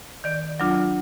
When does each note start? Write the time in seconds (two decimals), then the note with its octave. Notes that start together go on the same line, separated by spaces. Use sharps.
0.24 D#3 D5
0.60 F#3 D4 F4